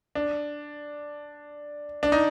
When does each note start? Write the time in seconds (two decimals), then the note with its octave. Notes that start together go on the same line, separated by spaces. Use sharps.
0.15 D4
2.03 D4
2.12 D#4